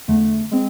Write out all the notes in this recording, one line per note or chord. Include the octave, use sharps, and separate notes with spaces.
E2 D3 A3
G#3 C4